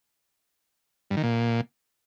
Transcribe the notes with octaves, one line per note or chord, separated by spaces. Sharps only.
G2
D#3
A#2